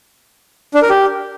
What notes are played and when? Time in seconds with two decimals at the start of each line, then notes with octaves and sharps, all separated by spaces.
0.74 D4
0.82 A#4
0.90 G4